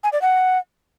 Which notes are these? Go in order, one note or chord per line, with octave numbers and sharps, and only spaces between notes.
G#5
D5
F#5